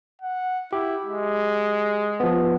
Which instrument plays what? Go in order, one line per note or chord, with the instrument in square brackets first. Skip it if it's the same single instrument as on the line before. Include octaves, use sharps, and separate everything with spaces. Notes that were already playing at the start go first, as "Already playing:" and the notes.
[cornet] F#5
[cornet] E4 [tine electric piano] G4
[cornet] G#3
[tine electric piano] F3 B3